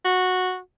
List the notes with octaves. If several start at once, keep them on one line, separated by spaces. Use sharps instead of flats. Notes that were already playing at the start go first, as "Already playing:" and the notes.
F#4